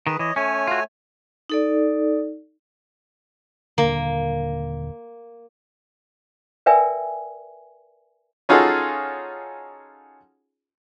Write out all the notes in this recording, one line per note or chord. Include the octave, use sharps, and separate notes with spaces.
D#3 G#4 B4
E3 C#5 D#5
A3 C#4 C#5 G#5
F4 F#4
D#4 A4 D5
D#1 D3 A#3
A#4 B4 D5 E5 G5 G#5
C#4 D#4 F4 F#4 G#4 A4